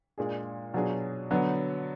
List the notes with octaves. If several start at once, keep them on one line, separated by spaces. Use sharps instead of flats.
A#2 G#3 D4 G#4
B2 F#3 D4 F4 G#4
D3 F#3 B3